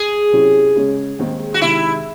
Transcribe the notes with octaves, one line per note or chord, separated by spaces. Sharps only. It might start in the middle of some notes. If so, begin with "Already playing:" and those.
Already playing: G#4
C3 F#3 C#4 E4
C#3 G#3 C#4
D#2 D#3 G#3 C4 D#4
F#4
C3 D#3 G#3 E4